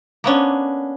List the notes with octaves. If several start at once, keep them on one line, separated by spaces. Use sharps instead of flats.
A#3 B3 C#4 D4